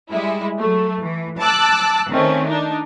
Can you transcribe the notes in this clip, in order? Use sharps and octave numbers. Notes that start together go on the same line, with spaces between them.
G3 G#3 E4
F#3 A3
E3
A5 D6 E6 F#6
D#3 A3 C4 C#4
D4 D#4